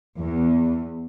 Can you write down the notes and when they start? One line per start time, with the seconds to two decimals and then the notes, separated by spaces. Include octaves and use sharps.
0.19 E2